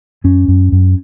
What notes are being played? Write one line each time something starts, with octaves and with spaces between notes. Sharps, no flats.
F#2 C#4
F#2
F#2